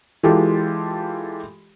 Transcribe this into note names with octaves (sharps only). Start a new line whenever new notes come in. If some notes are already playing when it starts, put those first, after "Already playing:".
E3 G#3 F4 G4 A4